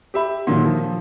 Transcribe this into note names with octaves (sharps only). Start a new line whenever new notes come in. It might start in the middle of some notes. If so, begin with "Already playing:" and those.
G4 E5 B5
A#2 D3 D#3 F#3 A#3
F3